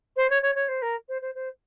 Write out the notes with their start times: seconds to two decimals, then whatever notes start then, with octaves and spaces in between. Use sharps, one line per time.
0.16 C5
0.30 C#5
0.42 C#5
0.55 C#5
0.68 C5
0.82 A#4
1.09 C5
1.22 C5
1.35 C5